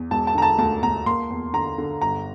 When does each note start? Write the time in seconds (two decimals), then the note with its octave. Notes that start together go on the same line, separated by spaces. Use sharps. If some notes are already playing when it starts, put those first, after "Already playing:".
Already playing: E2
0.11 E1 A5
0.27 A5
0.35 D3 A#5
0.42 A5
0.58 D2 A5
0.83 D2 A#5
1.06 A#3 C6
1.30 E2
1.53 D3 A#5
1.78 D3
2.01 G1 A#5